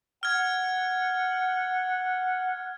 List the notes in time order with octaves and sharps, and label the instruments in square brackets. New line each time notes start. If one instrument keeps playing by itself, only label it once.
[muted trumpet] F#5 [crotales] F6 G#6